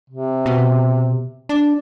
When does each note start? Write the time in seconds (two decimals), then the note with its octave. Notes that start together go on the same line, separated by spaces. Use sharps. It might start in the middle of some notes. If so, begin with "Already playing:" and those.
0.10 C3
0.46 B2
1.49 D4